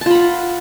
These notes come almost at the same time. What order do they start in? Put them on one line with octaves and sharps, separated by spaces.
A5 F4 B5 F#5